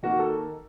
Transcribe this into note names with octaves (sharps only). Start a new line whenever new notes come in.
D#3 A#3 F#4
A4